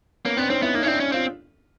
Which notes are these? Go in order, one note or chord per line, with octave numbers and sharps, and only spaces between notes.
A#3 B3 C#4
B3 C4 D4
C4 C#4 D#4
B3 E4
A#3 D#4
C#4
C4 D4 E4
C#4
C4 F4